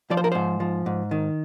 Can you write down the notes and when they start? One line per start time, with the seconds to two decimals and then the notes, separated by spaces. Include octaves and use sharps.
0.11 F3 D5
0.17 C5
0.24 A#4
0.32 G#2 C5
0.60 F3
0.86 G#2
1.11 D#3